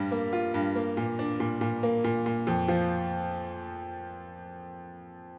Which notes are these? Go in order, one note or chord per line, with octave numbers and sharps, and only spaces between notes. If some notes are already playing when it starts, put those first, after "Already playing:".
Already playing: G2 G3
A#3
F4
G2
A#3
A#2
D4
A#2
A#2
A#3
A#2
A#2
F2
F3